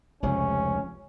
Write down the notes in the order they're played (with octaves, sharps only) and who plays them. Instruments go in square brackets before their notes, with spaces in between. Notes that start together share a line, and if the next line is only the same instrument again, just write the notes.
[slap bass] F1 C#2 C3 [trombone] C#4